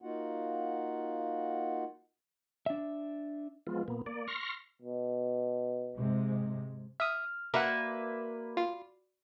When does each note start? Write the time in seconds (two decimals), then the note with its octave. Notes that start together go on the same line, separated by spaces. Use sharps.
0.02 A#3 D#4 F4 F#4 F#5
2.66 D4 E5
3.67 F3 G#3 B3 F4
3.88 A#2 A#3 B3
4.06 A#3 D5
4.28 C6 C#6 F6 A#6
4.82 B2
5.96 G#2 C3 G#3
7.00 E5 D#6 F6
7.54 A#3 F#4 A#4 B4 D5 E5 F#5 B5
8.57 F4